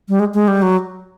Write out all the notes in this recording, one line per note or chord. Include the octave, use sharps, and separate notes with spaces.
G3
G#3
G#3
G3
F#3